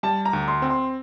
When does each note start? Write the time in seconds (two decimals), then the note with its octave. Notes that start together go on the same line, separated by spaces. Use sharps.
0.03 G3 A5
0.25 A#5
0.33 D2
0.48 C6
0.62 C4
0.70 C6